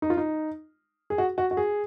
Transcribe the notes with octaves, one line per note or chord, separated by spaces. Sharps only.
D#4
F4
D#4
G#4
F#4
F#4
F#4
G#4